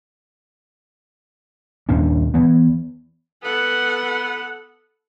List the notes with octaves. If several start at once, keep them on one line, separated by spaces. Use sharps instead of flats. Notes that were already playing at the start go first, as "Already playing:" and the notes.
D#2 A#2 C#4 D4
E3 B3
B3 A4 F#5